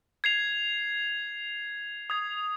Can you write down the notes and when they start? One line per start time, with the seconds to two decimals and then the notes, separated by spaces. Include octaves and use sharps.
0.24 G#6 C7 F7
2.10 D#6 G#6